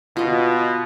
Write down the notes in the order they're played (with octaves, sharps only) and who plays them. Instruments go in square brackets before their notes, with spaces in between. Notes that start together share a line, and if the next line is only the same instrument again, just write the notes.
[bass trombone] B2 [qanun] F4 D#5